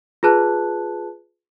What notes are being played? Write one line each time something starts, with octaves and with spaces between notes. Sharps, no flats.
F4 G#4 B4 A5 F#6